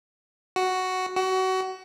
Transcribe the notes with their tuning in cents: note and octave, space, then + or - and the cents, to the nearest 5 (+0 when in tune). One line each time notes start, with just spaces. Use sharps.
F#4 +5
F#4 +25